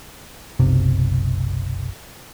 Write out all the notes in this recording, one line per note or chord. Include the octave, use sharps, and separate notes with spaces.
F#1 B1 C3